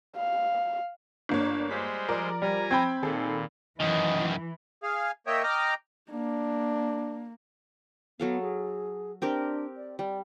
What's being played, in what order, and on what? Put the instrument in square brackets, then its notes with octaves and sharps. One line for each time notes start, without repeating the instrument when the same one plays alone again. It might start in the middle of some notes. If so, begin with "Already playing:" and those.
[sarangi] F5
[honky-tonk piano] G1 A#3 C#5 [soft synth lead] D4
[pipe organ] G3 G#3 C5 [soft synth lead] B6
[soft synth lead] F3 [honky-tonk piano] A#4 D5
[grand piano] G3 [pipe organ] G#5 A#5
[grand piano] C4 G5 B5 [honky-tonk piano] G#6
[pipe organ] A#2 [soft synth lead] D#3 [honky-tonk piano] G#4 A4
[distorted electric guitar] F#2 D#3 [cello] E3 [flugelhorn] D#5
[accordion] G#4 F5
A#3 C#5 D#5 E5 G5
D#5 G5 A#5 D6 F6
[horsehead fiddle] A#3 [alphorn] D4
[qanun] F#3 A4 F5 [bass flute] B3
[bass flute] G#4
[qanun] C4 G4 A#4 [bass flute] D4
[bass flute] D5
[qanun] G3 [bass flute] D5